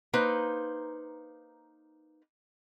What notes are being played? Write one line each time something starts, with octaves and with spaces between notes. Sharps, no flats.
A#3 D#4 B4 C5